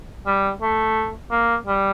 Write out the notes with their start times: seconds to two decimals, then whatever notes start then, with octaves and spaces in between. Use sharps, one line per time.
0.26 G3
0.61 A3
1.31 A#3
1.67 G3